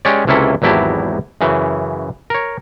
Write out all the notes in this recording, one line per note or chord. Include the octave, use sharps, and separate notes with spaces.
G#3 C#4 G4 C#5 D5
C#2 C3 A#3 C#4 E4 A4
G#1 E2 F#3 E4 G4 A5
F#2 C#3 E3
A#4 C#5